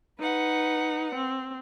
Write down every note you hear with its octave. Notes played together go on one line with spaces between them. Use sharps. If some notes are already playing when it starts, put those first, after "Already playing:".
D#4 B4 F#5
C4